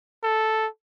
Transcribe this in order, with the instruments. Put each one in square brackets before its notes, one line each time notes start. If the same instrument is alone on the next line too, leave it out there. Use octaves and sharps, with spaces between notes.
[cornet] A4